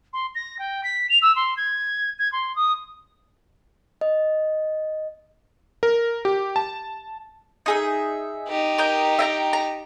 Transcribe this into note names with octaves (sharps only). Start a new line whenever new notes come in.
C6
A#6
G5
B6
F7
E6
C6
G#6
G#6
C6
D#6
D#5
A#4
G4
A5
D#4 G#4 E5
D#4 G4
A#4 D#5 G5
E5 G5 A#5
A#5